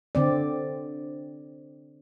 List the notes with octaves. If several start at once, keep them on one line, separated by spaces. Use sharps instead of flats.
D3 C4 D5